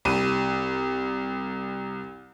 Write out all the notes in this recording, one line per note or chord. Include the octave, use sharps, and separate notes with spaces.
C2 D#7